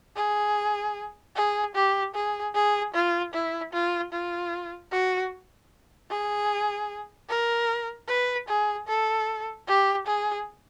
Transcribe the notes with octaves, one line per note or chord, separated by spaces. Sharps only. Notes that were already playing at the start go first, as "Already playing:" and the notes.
G#4
G#4
G4
G#4
G#4
F4
E4
F4
F4
F#4
G#4
A#4
B4
G#4
A4
G4
G#4